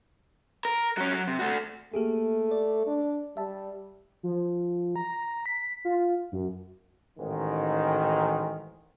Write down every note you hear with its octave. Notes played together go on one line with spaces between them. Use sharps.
A#4
F#3 C#4
F#3
C3
A3 F#4
A3 A#3 G4 G#4
D5
D4
G3 E5 A5
F3
A#5
B6
F4
F#2
A1 G#2 D#3